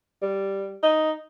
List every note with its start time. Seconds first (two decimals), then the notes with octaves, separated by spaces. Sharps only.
0.22 G3
0.83 D#4